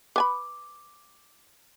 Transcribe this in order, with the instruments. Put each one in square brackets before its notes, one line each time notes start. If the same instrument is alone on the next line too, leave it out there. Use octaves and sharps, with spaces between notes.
[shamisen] B4 G#5 B5 [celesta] D6